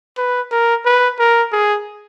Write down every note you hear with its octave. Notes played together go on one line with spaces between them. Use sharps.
B4
A#4
B4
A#4
G#4